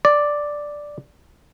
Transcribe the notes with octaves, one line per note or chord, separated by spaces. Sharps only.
D5